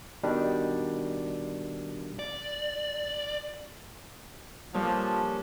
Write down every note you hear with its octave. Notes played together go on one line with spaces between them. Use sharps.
B2 D#3 G3 D4
D5
A#2 F3 G3 C#4 D4 A4